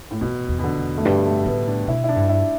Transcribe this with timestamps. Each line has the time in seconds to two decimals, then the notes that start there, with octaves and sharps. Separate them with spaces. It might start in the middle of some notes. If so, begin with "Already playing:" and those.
0.11 A2
0.21 E2 B2
0.49 E2
0.59 B2
0.64 D3
0.77 E2
0.98 A3
1.05 G2 G3
1.26 A3
1.46 A2 B3
1.67 D4
1.87 B2 E4
2.04 E4
2.09 D4
2.16 G2
2.29 E4